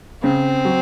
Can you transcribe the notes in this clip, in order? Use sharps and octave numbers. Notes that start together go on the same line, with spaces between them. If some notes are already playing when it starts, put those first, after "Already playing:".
C#3 C4
F#3